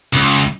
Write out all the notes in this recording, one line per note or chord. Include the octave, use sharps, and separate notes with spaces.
C#2